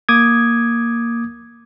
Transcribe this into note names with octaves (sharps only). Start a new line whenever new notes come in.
A#3 D6 D#6 G#6